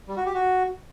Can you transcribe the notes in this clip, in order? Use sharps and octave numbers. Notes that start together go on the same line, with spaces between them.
G3
F#4
G4
F#4